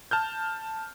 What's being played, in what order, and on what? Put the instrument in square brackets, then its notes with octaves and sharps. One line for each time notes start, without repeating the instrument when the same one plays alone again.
[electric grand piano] A5 F6 G6